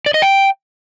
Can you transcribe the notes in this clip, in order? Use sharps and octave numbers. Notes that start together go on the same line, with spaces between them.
D5
D#5
G5